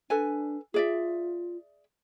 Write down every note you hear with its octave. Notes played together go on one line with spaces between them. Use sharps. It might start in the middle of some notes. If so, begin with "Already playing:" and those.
D4 A4 B4 G#5
F4 G#4 D5 E5